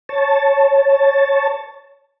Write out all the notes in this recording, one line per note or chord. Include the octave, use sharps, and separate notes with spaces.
C#5 A5